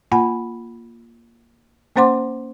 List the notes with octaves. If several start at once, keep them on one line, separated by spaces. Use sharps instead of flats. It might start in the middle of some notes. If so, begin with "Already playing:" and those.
A#3 F4 F#5 G#5 B5
A#3 C#4 C5 F#5 C6 D6